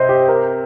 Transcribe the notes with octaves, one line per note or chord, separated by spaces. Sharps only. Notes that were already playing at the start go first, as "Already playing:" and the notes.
Already playing: C3 C5 D#5
G4
A#4